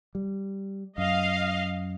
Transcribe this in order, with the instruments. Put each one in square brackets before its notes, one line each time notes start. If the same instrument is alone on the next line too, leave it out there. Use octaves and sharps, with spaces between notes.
[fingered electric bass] G3
[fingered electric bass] F#2 [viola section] D#5 F5